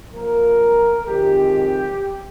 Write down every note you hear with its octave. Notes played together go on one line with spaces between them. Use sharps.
A#2 F3 A#3 A#4
F2 D#3 G#3 C4 G4